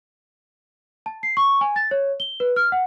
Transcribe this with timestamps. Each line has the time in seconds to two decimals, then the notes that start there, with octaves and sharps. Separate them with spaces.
1.06 A5
1.23 C7
1.37 C#6
1.61 G#5
1.76 A6
1.91 C#5
2.20 G7
2.40 B4
2.56 F6
2.72 F#5